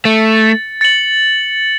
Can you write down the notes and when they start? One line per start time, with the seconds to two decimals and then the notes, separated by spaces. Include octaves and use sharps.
0.05 A3 A6 C#7 F#7
0.81 A6 C#7 F#7